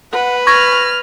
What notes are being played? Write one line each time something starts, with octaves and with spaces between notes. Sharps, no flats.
B4 F#5
C#6 F6 G#6 A#6